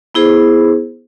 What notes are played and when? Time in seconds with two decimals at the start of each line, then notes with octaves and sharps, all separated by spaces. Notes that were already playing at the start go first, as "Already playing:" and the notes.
0.15 B3 E4 G#4 C5